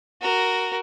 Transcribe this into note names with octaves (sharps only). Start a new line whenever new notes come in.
F#4 A#4